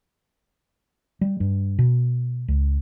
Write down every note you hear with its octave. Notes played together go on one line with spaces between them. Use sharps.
G3
G2
B2
C#2